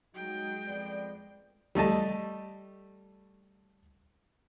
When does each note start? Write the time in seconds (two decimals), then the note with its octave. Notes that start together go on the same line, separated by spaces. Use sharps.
0.15 F#3 G#3 D#4 F#4 G5
0.66 F2 B3 D5
1.75 G3 A3 D#5 A5